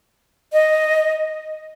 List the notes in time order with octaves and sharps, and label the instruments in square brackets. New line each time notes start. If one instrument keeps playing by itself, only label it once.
[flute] D#5